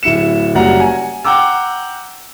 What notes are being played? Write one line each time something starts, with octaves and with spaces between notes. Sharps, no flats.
D1 E4 C#7 E7
F#1 G3 F#4 F#5 A#5
G#5
F#5 G5 A#5 D6 E6